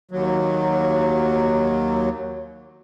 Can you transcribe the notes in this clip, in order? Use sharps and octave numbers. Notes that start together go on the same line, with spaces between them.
D#2 F#3